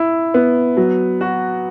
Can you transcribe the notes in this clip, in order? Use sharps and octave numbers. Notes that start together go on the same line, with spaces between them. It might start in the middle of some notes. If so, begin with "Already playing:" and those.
Already playing: E4
B3
F#3
F#4